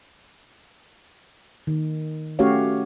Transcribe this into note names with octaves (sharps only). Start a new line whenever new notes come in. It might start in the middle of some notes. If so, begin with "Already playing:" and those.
D#3
A3 C#4 F#4 G4 C#5 F5